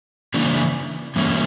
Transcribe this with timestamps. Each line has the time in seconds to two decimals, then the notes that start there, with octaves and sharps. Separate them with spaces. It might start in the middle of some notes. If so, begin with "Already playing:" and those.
0.34 C#3 E3 A#3 D4
1.16 G2 E3 A#3 C#4